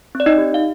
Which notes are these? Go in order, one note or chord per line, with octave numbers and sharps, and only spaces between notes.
C4
D5
D#4 D#5
G4
F5